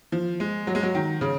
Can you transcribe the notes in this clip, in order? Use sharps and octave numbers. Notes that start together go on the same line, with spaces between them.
F3
G#3
F#3
G#3
F#3
D#3
C#3